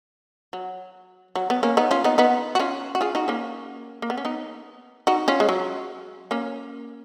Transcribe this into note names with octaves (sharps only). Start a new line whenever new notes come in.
F#3
F#3
B3
A#3 C#4
B3 D#4
C#4 F4
B3 D#4
B3 D#4
F#4
C#4 F4
F#4
F4 G#4
D#4 F#4
A#3 C#4
A#3
B3
C#4
B3 D#4
D#4 F#4
C#4 F4
G#3
F#3
A#3 C#4